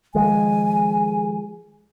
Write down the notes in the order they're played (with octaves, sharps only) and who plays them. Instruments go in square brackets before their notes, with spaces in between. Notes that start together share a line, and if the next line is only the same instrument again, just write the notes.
[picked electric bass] D#3 F3 G#3 [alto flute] G#5